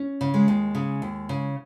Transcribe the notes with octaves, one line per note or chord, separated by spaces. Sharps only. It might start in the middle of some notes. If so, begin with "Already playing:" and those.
Already playing: C#4
C#3
G#3
D#2
C#3
D#2
C#3